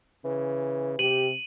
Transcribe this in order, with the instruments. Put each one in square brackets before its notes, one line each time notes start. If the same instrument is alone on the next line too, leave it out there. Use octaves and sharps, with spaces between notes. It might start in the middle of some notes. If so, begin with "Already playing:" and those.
[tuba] C#3 [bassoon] E3
[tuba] C3 [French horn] G4 [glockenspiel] D#7 F#7